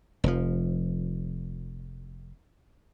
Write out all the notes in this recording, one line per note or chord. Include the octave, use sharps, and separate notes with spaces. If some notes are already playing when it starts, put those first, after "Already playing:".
F1 F3